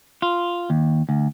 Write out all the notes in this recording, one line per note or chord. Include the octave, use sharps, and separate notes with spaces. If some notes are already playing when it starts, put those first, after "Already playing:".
F4
D#2
D2